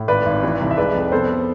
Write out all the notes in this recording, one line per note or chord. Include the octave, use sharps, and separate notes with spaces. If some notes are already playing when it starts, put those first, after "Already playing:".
Already playing: A2
G#1 B4 D5
G#1
E3
C2
E5
G#3 B4 D5
F2
B3 A4 C5